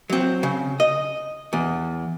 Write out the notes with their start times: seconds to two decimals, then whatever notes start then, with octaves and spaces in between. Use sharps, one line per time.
0.10 F#3 C4
0.43 C#3
0.80 D#5
1.53 E2